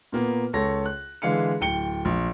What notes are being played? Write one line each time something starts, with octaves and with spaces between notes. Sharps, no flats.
A#2 A#3 B3
C#2 A4 C#5 A#6
F#6
D3 E3 G#3 F5 C#7
D1 G5 C#7 G7
A#1